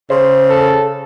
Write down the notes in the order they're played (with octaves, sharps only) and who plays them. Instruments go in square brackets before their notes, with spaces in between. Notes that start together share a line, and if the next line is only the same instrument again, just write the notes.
[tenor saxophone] C#3 [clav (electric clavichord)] C5
[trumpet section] A4